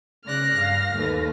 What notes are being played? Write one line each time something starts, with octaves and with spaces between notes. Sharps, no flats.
C#3 D5 F6 F#6 A#6
G2 F5
D#2 A3 B4